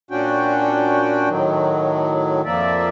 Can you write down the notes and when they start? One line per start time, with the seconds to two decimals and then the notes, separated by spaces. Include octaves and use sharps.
0.11 A#2 C#4 D4 F#4 G5
1.29 A2 D#3 F#3
2.45 F2 F3 A#3 D5 E5